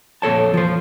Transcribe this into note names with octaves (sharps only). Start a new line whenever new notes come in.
F2 A#2 A4 C#5 A5
F3 C5